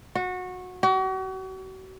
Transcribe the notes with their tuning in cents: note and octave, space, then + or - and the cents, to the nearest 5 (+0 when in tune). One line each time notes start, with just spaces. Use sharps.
F#4 -20
F#4 +40